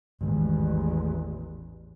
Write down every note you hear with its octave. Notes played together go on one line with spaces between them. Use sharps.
A1 E2 G#2 D#3 G#3